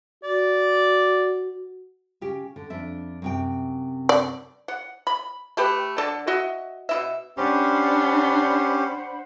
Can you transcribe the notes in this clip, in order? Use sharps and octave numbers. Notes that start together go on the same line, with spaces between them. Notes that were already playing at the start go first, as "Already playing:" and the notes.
F#4 D5
C#3 G4
D3
F2 D4 E5
F#2 C3 G5
D5
F#5
B5
A3 G4 B4
D3 A4 D5 A5
F#4 D#5 E5
B2 E4 E5
C#4 D4 G4 C5 F#5 B5